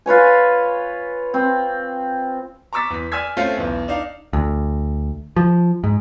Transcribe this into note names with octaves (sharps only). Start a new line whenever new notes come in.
F4 B4 C#5 G#5
C4
A#5 C#6 D6 E6 A6 B6
E2 B6
D5 G#5 E6 F6 G#6 B6
A3 C4 C#4 F4 F5
B1 E2
D4 D#4 F5
D2
F3
G#2